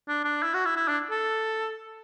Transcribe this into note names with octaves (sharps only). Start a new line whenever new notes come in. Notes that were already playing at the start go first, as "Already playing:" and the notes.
D4
D4
E4
F#4
E4
E4
D4
A4